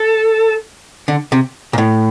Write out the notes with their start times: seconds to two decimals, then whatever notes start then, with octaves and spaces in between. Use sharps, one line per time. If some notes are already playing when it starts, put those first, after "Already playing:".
Already playing: A4
1.08 D3
1.32 C3
1.73 A#2
1.78 A2